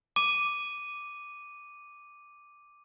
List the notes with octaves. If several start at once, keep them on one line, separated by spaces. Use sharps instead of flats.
D6 D#7